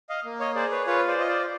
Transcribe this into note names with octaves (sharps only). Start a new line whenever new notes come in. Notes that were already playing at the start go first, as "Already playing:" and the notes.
D#5 F5
A#3
C#5 D#5
G#4 C5 D5
B4 C#5
F4 B4 C#5
C5 D5
F4 D#5
C5 D5